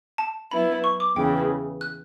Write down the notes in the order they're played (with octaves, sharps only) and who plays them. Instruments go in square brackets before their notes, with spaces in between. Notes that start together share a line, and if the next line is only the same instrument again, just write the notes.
[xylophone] A5
[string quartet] F#3 B3 E4 [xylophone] B5
[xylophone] C#6
D6
[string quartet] E2 C#3 E3 [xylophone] G5
[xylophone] F#6